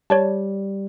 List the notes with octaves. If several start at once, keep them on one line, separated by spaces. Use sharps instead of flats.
G3 C#5 D5 A5